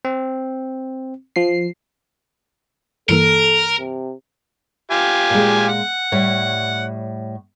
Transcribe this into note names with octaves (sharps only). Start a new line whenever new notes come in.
C4
F3 C7
G2 E3 A#3 A4 A#4
C3
F4 G4 G#5
A#2 G#3
F#5
A2 G3 C#5